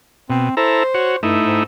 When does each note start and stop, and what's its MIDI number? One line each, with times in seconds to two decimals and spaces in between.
0.30 0.49 47
0.30 0.53 60
0.57 0.83 64
0.57 0.83 69
0.57 1.17 72
0.57 0.83 82
0.94 1.16 66
0.94 1.16 73
1.23 1.38 43
1.23 1.63 57
1.23 1.63 63
1.23 1.63 64
1.45 1.62 44